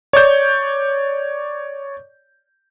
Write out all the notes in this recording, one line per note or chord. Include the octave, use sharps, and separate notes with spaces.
C#5 D5 G6